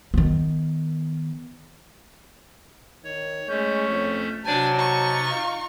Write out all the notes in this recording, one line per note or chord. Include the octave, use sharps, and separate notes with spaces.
D#3 B3
D#3 C#5
G#3 A3 C#4 C#5 G6
F2
C3 F#3 D4 C5 G#5 A5 A6
D#4 C#6
F4 F5